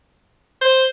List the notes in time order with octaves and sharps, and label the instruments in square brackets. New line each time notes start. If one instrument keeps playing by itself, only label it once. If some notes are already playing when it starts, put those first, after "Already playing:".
[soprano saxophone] C5